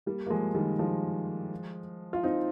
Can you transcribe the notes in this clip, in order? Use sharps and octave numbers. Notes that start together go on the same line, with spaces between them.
G3 A#3
A#3
F3 G#3
D#3 G3
F3 G#3
F4
C4 D#4